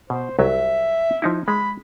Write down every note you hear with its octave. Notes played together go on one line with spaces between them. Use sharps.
B2 C5
C2 F#3 E5
F3 D#4 E4
G#3 B5